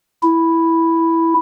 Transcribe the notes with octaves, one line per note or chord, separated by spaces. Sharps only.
E4